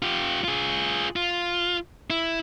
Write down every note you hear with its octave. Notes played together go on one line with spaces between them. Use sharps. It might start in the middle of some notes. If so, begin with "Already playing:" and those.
F4 G4
F4 G#4
F4
E4